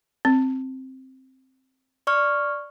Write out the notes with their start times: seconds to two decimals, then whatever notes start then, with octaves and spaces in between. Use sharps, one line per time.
0.25 C4
2.07 D5 C#6 F6